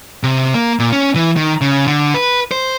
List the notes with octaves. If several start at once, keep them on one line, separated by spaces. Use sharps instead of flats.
C3
A#3
A#2
C#4
E3
D#3
C#3
D3
B4
C5